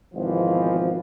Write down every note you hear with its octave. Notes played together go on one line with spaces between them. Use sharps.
G#1 B2 E3 F3